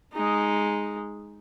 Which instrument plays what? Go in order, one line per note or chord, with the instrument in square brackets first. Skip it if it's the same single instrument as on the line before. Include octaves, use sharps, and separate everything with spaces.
[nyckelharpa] G#3 D#4